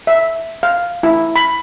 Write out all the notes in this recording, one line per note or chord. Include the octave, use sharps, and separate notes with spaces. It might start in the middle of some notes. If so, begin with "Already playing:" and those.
E5
F5
E4
B5